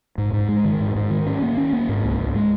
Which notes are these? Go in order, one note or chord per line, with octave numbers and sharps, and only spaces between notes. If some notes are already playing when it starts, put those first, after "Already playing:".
G#2
G#2
G#3
D#3
G#2
G#2
D#3
C#4
A#3
C#4
A#3
G#2
C#2
C#2
G#3